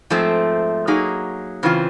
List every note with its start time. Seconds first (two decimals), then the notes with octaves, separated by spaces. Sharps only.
0.10 G#2 F3 A3 C4
0.87 F#3 A#3 D#4 G#4
1.63 C#3 E3 C4 F4